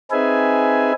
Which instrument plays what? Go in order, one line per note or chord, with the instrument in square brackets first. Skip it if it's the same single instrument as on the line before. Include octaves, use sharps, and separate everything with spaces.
[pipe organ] C4 D#4 G#4 B4 E5 G#5